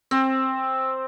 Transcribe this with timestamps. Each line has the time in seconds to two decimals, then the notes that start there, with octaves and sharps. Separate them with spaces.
0.11 C4